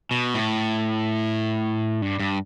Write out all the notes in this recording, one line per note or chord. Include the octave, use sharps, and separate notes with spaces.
B2
A2
G2
G2